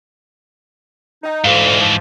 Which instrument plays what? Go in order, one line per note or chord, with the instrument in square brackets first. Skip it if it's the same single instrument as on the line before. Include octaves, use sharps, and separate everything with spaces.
[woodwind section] D#4
[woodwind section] D2 F5 [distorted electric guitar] G#2 E3
[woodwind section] F3